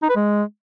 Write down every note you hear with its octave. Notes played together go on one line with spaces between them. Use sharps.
D#4
B4
G#3